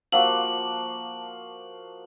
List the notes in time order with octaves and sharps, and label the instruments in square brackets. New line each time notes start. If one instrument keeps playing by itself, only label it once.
[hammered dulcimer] F3 A#3 F#4 [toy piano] F5 F#5 E6 [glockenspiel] F#7